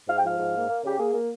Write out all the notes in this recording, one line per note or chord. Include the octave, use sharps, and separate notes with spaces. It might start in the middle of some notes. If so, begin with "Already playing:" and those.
G#2 F5
G5
F3 F5
G#2
A#3
A#3
C#3 G4
A#3 G#4
A#3